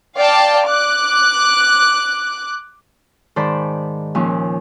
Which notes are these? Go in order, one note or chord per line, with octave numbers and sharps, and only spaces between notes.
D5 F5 G5 A5
D6 F#6
G#2 D#3 C5 D5 A5 B5
D#2 A#2 F3 C#4